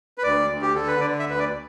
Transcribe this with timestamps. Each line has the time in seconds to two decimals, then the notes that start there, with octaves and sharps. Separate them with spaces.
0.18 B4
0.23 D2 D5
0.49 D2
0.62 G4
0.75 D3 A4
0.87 B4
1.00 D3 D5
1.19 E5
1.26 D2 B4
1.39 D5